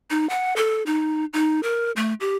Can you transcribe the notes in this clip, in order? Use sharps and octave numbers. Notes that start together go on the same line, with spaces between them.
D#4
F#5
A4
D#4
D#4
A#4
A3
G4